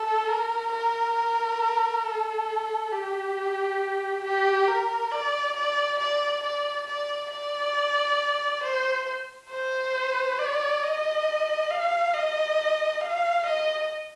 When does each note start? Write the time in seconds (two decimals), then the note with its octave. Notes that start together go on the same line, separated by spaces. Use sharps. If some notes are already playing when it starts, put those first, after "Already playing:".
Already playing: A4
0.28 A#4
0.72 A#4
2.04 A4
2.92 G4
4.24 G4
4.68 A#4
5.11 D5
5.56 D5
5.99 D5
6.43 D5
6.87 D5
7.32 D5
8.63 C5
9.51 C5
10.39 D5
10.83 D#5
11.70 F5
12.14 D#5
13.01 F5
13.46 D#5